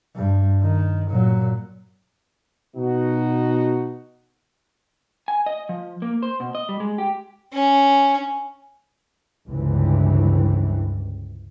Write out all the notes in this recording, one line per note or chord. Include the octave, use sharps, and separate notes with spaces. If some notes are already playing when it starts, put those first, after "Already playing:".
G2
D#3
A#2 F#3
B2 D#4 F#4
G#5
D#5
F3
A#3
C5
B2
D#5
G3
G#3
G4
C#4
G1 C#2 C3 E3